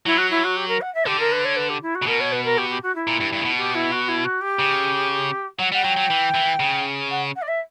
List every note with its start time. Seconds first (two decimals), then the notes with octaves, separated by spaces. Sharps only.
0.06 F#3 E4
0.18 F#4
0.30 E4
0.44 F#4
0.56 G4
0.68 A#4
0.81 F#5
0.94 E5
1.06 D3 G4
1.20 A#4
1.32 B4
1.45 C#5
1.57 B4
1.69 G4
1.82 E4
1.95 F#4
2.02 C#3
2.06 B2 A#4
2.20 C#5
2.32 B4
2.44 A#4
2.58 G4
2.70 G4
2.83 F#4
2.95 E4
3.07 A#2
3.20 G2
3.33 G2
3.41 C#3
3.45 B2
3.57 G4
3.75 E4
3.92 F#4
4.08 E4
4.24 F#4
4.41 G4
4.59 C#3
5.59 F#3 F#5
5.72 G3 F#5
5.84 F#3 G5
5.97 F#3
6.10 E3
6.34 E3
6.60 C#3
7.11 F#5
7.36 F#5
7.42 D5
7.48 E5